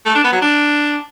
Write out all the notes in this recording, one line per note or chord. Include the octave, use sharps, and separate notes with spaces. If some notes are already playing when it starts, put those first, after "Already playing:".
A3
D4
B3
F#3
D4